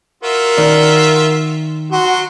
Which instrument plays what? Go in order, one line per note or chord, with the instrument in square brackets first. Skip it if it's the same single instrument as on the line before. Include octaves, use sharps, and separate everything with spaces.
[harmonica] F4 F#4 E5 [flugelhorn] A#4
[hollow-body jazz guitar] D#3 D5
[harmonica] F#3 C6 [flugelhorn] F#4